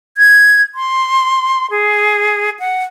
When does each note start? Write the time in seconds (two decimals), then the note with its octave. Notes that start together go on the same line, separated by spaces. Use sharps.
0.18 G#6
0.75 C6
1.70 G#4
2.59 F#5